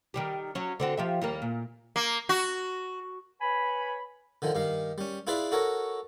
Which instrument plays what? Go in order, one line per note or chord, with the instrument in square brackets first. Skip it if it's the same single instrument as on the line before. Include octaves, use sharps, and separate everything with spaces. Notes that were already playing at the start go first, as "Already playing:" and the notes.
[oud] D#3 G3 G4
F#3 C#4
D3 C4 F#4
F3 G4 E5
D#2 G3 A#3
A#2
[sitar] A#3
F#4
[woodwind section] B4 C#5 G#5 B5
[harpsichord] D3 D#3 F3
G2 D#3 F5
G3 C#4
E4 F4 G#4 B4 D5 B5
F#4 A4 A#4 C#5